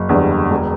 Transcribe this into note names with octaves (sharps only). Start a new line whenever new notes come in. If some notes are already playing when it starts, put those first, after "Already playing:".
Already playing: F#1
E2 D3 G3
E1